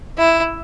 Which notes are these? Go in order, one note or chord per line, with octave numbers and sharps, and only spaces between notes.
E4